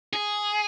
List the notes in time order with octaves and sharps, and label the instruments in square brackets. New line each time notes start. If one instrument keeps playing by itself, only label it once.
[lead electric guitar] G#4